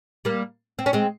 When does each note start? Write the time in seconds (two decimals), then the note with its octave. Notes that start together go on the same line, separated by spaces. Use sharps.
0.25 G3 A#3
0.79 C4
0.86 C#4
0.93 G#3 C4